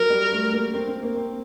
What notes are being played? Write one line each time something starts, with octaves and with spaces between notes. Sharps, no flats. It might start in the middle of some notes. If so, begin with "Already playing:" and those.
Already playing: F#3 A#4
G3
A3
A#3
C4
C4
A#3
C4